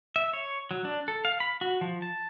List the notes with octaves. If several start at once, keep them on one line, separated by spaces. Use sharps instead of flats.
E5
C#5
F#3
D4
A4
F5
B5
F#4
F3
A5